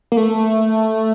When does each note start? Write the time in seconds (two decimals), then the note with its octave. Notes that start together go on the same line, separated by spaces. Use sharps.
0.12 A#3
0.17 A3